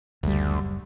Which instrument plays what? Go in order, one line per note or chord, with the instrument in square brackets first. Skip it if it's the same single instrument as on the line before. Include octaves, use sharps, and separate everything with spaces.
[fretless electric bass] F#1 G3 [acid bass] D2